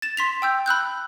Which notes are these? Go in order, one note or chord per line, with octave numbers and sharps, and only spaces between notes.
A6 E7
C6 B6 F7
G5 E6 G6
B5 E6 F#6 G6